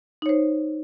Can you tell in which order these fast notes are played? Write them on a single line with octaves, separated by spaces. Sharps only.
D#4 C#5 C5